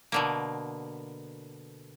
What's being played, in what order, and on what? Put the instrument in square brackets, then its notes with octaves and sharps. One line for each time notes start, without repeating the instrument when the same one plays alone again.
[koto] B2 D3 A#3